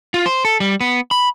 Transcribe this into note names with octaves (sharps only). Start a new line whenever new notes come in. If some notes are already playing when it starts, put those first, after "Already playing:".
F4
C5
A4
G3
B3
B5